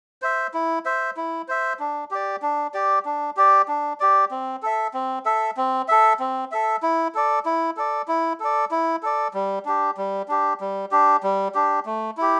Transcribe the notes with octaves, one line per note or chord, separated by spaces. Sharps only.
C5 E5
E4
C5 E5
E4
C5 E5
D4
G4 D5
D4
G4 D5
D4
G4 D5
D4
G4 D5
C4
A4 E5
C4
A4 E5
C4
A4 E5
C4
A4 E5
E4
A4 D5
E4
A4 D5
E4
A4 D5
E4
A4 D5
G3
D4 G4
G3
D4 G4
G3
D4 G4
G3
D4 G4
A3
E4 G4